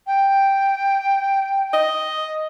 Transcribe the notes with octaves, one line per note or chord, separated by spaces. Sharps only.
G5
D#5